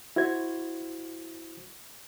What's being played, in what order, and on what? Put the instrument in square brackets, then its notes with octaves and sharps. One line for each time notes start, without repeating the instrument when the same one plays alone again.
[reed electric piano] E4 F#4 C5 G#6